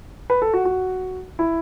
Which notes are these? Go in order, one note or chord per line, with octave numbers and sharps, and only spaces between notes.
B4
A4
F#4
F#4
E4